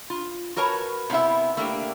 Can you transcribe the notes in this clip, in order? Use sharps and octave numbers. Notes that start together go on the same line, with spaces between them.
F4
F#4 A#4 B4 C#5 A5
C3 B3 E4 E5
A3 A#3 D4 G4